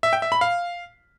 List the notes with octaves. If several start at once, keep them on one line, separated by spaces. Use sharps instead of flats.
E5
G5
E5
B5
F5